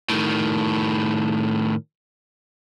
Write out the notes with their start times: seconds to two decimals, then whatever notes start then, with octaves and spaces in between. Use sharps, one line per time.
0.10 A2 D#3